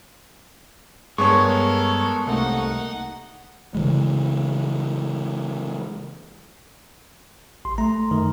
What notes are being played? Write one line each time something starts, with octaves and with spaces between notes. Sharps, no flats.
G2 G#3 B3 A4 A#4 C#5 C#6
C2 A3 A#3 D#4 F#5
C#3 E3 G#3
A1 C6
A3 A#5
F#2 D#3